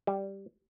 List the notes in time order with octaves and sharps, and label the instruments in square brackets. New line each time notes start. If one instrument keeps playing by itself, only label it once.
[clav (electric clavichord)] G3